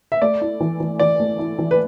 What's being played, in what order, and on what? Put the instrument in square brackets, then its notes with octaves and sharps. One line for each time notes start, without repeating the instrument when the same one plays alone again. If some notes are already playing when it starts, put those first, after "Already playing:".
[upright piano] E5
[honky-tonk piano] A3 [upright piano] D5
[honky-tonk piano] E4
E3
E3
[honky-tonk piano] E3 [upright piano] D5
[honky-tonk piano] A3
E4
E3
[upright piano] B4